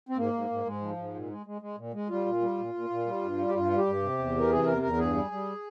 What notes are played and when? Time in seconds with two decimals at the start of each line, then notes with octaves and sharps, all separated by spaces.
0.09 C4
0.17 G#2 A#3
0.33 G#2
0.50 G#2
0.65 G#2 G#3
0.81 F3
0.97 G#2
1.14 A#2
1.29 G#3
1.46 G#3
1.62 G#3
1.78 A#2
1.94 G#3
2.09 G3 F4
2.26 A#2
2.41 G3
2.58 A#2
2.74 A#2
2.90 A#2
3.06 G3
3.22 G2
3.37 G3
3.49 G4
3.55 G2 F4
3.70 G3
3.78 G4
3.86 G2
4.02 C3
4.18 E2
4.35 E3 A#4
4.50 C3 G#4
4.66 E2 A#4
4.82 E2 A#4
4.98 G2 G#4
5.15 G3
5.31 G3